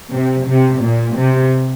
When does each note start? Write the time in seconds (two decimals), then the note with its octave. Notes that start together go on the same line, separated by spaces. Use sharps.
0.13 C3
0.48 C3
0.83 A#2
1.17 C3